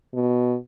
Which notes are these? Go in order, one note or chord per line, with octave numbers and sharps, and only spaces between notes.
B2